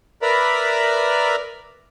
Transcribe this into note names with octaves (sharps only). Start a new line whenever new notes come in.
A#4 B4 D5 E5 A#5 B5